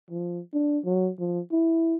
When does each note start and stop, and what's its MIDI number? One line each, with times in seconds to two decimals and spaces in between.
0.11 0.40 53
0.53 0.78 62
0.85 1.11 54
1.20 1.40 53
1.52 1.97 64